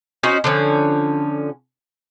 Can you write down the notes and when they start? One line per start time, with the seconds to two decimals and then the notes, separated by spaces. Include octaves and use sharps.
0.23 C#4 D#4 F#4 C5
0.44 D3 F3 C#4